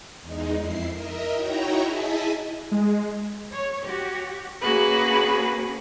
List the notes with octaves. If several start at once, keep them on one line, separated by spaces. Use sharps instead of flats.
E2 G#3 D#4
F2 E4 C7
A#4 D#5 E5
D#4 E4 F#4 C#5 G5 A#5
E4 G#4 D#5 E5 G#5 A5
G#3
C#5
F#4 G4
A#3 C#4 F#4 G#4 B4